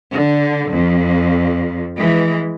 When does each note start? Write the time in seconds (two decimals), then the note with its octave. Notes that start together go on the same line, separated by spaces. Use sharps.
0.13 D3
0.70 F2
1.97 E3 G#3